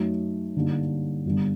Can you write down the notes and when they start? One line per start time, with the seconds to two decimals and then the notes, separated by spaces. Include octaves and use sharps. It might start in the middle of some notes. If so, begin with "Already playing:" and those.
Already playing: F#2 F#3 A3 D#4
0.55 G2 D3 G3 A#3 D#4
1.25 G1 G2 D3